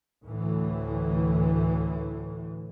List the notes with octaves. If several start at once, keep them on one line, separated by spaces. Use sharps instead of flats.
D2 A2 E3